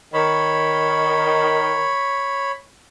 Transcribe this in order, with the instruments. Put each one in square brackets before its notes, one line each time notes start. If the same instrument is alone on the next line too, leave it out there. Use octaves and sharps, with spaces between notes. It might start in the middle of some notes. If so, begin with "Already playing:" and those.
[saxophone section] D#3 [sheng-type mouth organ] C#5 B5